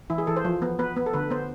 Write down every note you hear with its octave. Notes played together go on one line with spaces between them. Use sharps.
E3 E4
G#4
E3 A4
C5
F3
B3
B3 B4
B3
A4
D3 B4
B3 C5